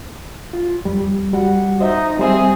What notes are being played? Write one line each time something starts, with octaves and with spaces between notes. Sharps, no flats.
F4
F2 G3
G3 F#4 F#5
D#4 C5 D#5 E5
G3 C4 G#4 C5 E5